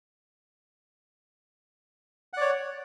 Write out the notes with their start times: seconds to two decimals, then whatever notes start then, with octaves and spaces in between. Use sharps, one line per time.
2.33 F#5
2.37 D5
2.41 C#5